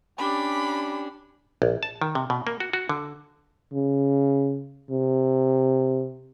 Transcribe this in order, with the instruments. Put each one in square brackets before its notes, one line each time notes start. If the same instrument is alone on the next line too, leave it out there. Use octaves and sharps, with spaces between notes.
[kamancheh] C#4 G4 [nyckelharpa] D4 [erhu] B5
[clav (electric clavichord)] A#1
A5
D#3
C3
B2
A#3
F#4
F#4
D3
[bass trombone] C#3
C3